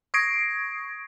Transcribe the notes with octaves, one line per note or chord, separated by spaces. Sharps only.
C#6 D#6 G#6 A#6 C7 D7